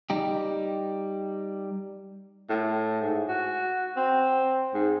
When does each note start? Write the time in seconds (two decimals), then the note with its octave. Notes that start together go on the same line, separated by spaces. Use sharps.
0.10 G3 D#4 G4
2.50 A2
3.02 G#2
3.29 F#4
3.97 C4
4.74 G#2